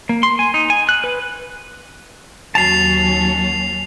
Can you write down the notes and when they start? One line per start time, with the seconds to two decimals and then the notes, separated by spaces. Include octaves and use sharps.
0.09 A#3
0.23 C6
0.39 G#5
0.54 D#4
0.70 G#5
0.89 F#6
1.04 B4
2.55 D#2 F#3 C#4 A5 C7 F7